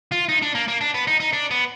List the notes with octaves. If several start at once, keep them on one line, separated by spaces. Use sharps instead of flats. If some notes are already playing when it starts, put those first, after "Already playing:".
F4
D#4
D4
A#3
A#3
D4
B3
D#4
D#4
D4
B3